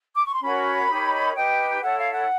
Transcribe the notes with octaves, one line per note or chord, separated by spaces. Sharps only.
D6
C#6
C6
C#4 F#4 A#4 C#5 B5
D#4 G4 A#4 C#5
D#4 G4 B4 G5
E4 A4 C#5 F#5
F5
F#5